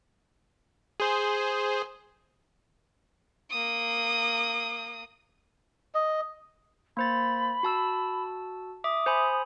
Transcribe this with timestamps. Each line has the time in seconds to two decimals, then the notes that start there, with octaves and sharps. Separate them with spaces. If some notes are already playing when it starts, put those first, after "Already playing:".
1.00 G#4 C5
3.51 A#3 D#6
5.95 D#5
6.97 A#3 C5 B5 A6
7.63 F#4 A5 E6
8.84 E5 D6 D#6
9.06 C5 G#5 B5